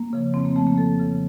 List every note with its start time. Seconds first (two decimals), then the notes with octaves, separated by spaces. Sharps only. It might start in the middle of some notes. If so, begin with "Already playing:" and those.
Already playing: A#3
0.13 C#3 F3
0.34 F2 C4
0.45 A#3
0.56 C#3 F3 A3
0.67 A#3
0.77 F2 A4
1.00 C#3 F3